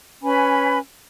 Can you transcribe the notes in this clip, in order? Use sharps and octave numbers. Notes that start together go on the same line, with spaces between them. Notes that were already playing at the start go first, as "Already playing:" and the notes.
C#4 B4 G#5 B5